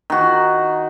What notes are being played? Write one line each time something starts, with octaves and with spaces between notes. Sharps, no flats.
D#3 F#4